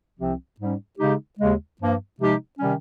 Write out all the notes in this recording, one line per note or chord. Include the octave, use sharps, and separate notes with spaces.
C2 C3 F3 C4
G#2 G3 C#4
C#3 G#3 D#4 G4
D#2 C#3 G#3
G2 F3 A#3
C3 F3 G#3 D#4 G4
C3 D#3 G3 C#4